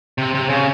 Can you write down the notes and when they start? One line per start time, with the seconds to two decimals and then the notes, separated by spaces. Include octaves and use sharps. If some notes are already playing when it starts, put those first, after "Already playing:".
0.18 C3
0.35 C3
0.49 C#3